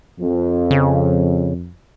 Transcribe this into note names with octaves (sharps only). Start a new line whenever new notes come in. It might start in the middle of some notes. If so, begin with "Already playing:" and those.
F2
C#3